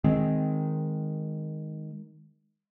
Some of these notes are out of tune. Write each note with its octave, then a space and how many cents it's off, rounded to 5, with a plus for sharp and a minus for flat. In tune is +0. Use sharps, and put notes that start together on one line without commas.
D#3 +0 G#3 +0 C4 +0